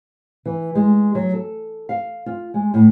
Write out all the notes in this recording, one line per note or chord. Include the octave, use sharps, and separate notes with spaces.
E3
G#3
F#3
A4
F5
F4
G#3
A2